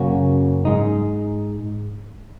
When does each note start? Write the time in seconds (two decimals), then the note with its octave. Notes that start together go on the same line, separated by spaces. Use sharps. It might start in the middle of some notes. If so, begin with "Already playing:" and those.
Already playing: F#2 C#3 A#3 C#4 F#4
0.65 G#2 G#3 D#4